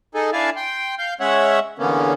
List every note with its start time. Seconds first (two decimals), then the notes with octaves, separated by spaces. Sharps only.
0.15 D#4 G#4 A4
0.33 D4 E4 D5 F5 G#5 A5
0.56 G5 C6
0.98 F5 G6
1.20 G#3 C#4 C#5 E5 F#5
1.79 E2 D3 A#3 B3 C#4